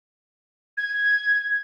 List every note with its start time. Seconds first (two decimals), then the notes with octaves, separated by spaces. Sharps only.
0.77 G#6